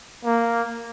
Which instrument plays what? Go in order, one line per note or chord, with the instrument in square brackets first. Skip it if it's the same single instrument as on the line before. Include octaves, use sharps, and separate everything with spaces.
[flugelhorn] A#3